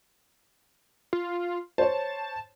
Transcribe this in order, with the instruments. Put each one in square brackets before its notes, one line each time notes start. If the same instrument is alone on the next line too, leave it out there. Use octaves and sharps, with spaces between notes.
[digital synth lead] F4
[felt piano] C5 C#5 [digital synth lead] A5